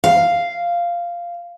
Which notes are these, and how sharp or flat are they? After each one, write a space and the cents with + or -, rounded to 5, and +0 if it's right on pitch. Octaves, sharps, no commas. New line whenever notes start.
F5 -5